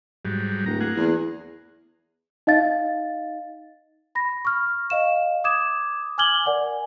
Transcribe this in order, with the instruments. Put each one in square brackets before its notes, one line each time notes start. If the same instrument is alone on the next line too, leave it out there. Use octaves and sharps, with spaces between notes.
[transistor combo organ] G#2 F#3 G3
[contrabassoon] D1 [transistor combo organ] A#5
[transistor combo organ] A#3 G#4 F#5
[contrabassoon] E2
[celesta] D#4 D#5 F5 A6
B5 A#6
C#6 F6
D#5 F5 E7
D6 D#6 G#6 E7
G#5 D6 F6 G#6 F#7 G7
A#4 D5 F#5 G#5